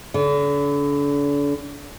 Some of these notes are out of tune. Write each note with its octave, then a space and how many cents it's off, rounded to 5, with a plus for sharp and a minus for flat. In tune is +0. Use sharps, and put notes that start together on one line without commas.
D3 -40